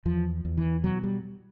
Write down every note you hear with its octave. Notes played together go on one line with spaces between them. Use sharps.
E2 F3
E2
E3
B2 F#3
G3